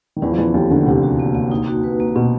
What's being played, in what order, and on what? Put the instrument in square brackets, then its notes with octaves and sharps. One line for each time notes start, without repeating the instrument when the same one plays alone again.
[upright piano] D#3
[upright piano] E2 E3 [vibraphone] C#4
[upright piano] F3
[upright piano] E2 E3 [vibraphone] F4
[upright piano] D#2 D#3 [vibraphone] A4
[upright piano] D2 D3 [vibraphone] A3
[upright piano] C2 C3 [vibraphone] D4
[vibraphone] F#4
A#3
A#3
D#4
F#4
B4
A#3
[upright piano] B2 [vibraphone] C4